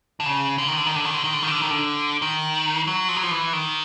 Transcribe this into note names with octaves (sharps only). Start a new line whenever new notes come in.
D3
C#3
D3
D#3
D3
D#3
D3
D#3
D3
D#3
D3
D#3
D3
D#3
D3
D#3
F#3
F3
F#3
F3
E3
D#3